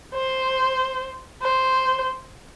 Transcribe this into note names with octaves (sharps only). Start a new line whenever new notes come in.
C5
C5